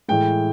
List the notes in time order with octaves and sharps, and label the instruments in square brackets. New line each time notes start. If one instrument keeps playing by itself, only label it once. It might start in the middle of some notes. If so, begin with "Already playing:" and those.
[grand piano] A2 E3 G#3 G5